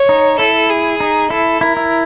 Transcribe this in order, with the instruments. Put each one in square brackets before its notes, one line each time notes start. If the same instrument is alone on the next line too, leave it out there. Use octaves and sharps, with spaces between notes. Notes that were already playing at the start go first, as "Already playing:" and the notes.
Already playing: [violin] C#5
[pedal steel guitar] D#4
[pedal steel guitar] E4 [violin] A4
[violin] G#4
[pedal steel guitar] D#4
[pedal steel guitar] E4 [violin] A4
[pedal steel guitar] E4 [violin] A#4
[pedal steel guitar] E4